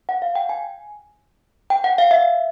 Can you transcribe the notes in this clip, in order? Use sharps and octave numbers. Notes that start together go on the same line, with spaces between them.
F#5
F5
G5
G#5
G5
F#5
F5
E5